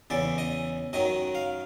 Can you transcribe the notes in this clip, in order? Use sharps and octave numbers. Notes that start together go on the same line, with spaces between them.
E2 C#3 E3 D5
D#5
F#2 D#3 F#3 D#5
F5